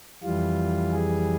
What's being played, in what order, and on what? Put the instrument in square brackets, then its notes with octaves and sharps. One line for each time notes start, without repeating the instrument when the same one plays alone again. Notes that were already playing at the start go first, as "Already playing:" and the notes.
[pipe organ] F2 E3 G3 F4
G#4